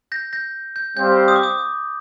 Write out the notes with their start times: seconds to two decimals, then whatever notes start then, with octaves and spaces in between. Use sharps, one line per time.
0.12 G6 A#6
0.33 G6 A#6
0.76 G6
0.97 G3 C4 G4 C5 F5 G6
1.28 D#6
1.36 D6
1.43 D#6